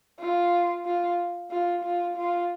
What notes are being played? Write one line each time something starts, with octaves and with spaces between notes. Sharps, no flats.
F4
F4
F4
F4
F4